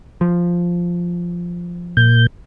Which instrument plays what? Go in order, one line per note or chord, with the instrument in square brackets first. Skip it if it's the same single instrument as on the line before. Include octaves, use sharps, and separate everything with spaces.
[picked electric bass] F3
[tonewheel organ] A#2 G6